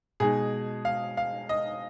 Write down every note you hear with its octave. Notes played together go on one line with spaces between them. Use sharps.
B2 G#3 D#4 G#4
F5
F5
D#5